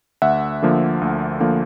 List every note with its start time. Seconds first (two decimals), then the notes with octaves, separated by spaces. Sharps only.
0.22 D2 E5 F#5
0.62 D3 F3 A#3
1.01 D2
1.40 D3 F3 A#3